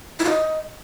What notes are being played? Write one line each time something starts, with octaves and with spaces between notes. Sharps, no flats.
E4
F4
D#5